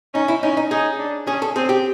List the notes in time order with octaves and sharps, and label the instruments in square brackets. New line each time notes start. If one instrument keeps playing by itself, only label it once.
[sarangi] C#4 [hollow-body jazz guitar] D#4
[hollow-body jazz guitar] E4
[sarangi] C#4 [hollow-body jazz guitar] D#4
[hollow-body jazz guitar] D#4
[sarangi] D#4 [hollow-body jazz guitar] G#4
[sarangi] D4
[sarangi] C#4 [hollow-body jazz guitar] G#4
[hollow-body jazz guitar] A4
[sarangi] C4 [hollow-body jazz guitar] G#4
[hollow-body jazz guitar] G4